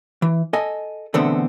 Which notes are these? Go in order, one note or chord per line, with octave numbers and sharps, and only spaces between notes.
E3
A4 D#5 G#5
E2 B2 D3 A3 B3 C4